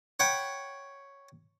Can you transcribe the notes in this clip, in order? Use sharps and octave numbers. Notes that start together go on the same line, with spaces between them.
C#5 F#5 G5 B5